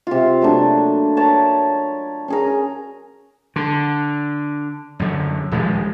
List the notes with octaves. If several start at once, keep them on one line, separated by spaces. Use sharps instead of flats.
C3 F4
F#3 A3 A#3 D4
A#4 C#5 E5 A5
C#4 G#4 A#4
D3
F#2 D3
D#1 F3 G#3